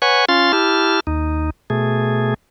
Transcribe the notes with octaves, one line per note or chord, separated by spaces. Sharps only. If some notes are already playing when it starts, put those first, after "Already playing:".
B4 C#5 F#5 G#5 C#6
C#4 F4 F5 C6 A6
E4 G4 A5 F6
D#2 D#4
B2 A3 G#4